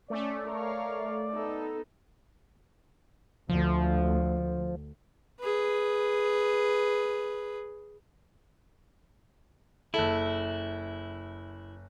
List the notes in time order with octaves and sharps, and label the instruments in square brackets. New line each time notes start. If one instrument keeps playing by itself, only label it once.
[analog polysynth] A3 [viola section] C#4 [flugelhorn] D5
[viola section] A#4 C#5 F5
B3 D#4 A4
[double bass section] D2 [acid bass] F3
[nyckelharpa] G#4 B4
[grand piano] F#1 A4 [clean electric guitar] E4